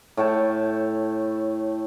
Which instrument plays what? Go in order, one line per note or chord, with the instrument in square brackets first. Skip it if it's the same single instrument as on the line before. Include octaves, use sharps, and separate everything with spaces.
[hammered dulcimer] A2 C#5 G5 A5